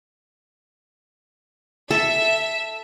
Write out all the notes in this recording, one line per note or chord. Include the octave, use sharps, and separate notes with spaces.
A4 E5